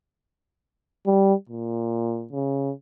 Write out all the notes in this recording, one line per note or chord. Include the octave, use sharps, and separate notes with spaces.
G3
A#2
C#3